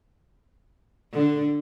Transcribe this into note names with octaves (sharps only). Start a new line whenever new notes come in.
D3